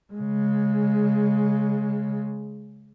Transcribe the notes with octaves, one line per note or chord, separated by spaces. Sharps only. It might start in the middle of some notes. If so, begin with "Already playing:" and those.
C#3 G#3